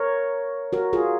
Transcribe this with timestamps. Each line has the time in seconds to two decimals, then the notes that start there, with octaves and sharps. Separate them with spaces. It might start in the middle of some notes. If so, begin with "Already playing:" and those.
Already playing: A#4 C#5
0.73 F#4 A#4
0.93 F4 G#4